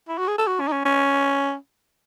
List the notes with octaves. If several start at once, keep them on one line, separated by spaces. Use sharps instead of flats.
E4
F#4
G#4
A4
F#4
C#4
D#4
C#4
C#4